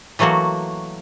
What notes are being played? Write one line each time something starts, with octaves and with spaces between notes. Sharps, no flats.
E3 F#3 A3 A#3 F#4